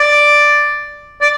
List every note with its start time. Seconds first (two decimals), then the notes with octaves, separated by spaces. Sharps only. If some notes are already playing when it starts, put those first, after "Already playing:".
Already playing: D5
1.21 D5